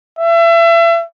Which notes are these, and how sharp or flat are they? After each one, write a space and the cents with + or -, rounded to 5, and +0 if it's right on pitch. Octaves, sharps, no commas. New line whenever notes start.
E5 +35